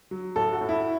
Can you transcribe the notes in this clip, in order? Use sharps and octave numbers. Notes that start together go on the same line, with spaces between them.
F#3
A2 A4
F#4
A2
E4